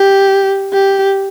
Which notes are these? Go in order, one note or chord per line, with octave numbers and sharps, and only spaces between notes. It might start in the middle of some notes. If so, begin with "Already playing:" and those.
Already playing: G4
G4